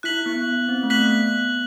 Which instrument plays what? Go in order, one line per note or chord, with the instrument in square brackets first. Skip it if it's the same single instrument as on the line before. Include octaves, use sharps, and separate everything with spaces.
[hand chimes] E4 [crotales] F#6 B6 F#7
[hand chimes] B3
C4
A3
[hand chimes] B3 [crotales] F#6 B6 F#7